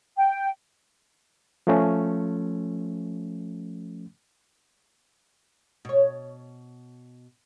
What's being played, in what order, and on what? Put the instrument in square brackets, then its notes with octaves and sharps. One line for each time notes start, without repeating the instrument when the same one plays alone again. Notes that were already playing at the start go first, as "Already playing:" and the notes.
[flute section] G5
[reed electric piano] F3 A3 C#4
[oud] B2 C#5